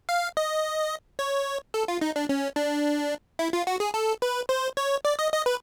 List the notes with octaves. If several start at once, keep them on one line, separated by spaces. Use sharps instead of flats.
F5
D#5
C#5
A4
F4
D#4
D4
C#4
D4
E4
F4
F#4
G#4
A4
B4
C5
C#5
D5
D#5
D#5
B4